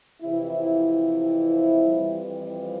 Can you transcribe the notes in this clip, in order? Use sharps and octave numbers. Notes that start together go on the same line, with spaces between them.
F2 C3 E3 E4
F2 E3 G3